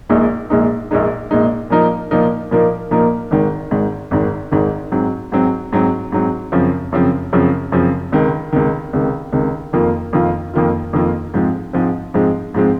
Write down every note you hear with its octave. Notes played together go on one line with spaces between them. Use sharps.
A#1 A#2 G#3 D#4
A#1 A#2 G#3 D#4
A#1 A#2 G#3 D#4
A#1 A#2 G#3 D#4
A#2 F3 A#3 D#4 A#4
A#2 F3 A#3 D#4 A#4
A#2 F3 A#3 D#4 A#4
A#2 F3 A#3 D#4 A#4
G#1 G#2 D#3
G#1 G#2 D#3
G#1 G#2 D#3
G#1 G#2 D#3
G#2 F#3 C4
G#2 F#3 C4
G#2 F#3 C4
G#2 F#3 C4
F#2 C#3 F3 C4
F#2 C#3 F3 C4
F#2 C#3 F3 C4
F#2 C#3 F3 C4
C#2 C3 D#3
C#2 C3 D#3
C#2 C3 D#3
C#2 C3 D#3
F2 D#3 A#3 F4
F2 D#3 A#3 F4
F2 D#3 A#3 F4
F2 D#3 A#3 F4
G#2 F3 G#3 C4
G#2 F3 G#3 C4
G#2 F3 G#3 C4
G#2 F3 G#3 C4